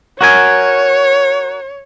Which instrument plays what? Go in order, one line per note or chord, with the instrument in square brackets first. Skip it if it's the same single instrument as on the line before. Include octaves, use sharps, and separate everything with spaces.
[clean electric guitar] F#4 A#4 G#5 [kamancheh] C#5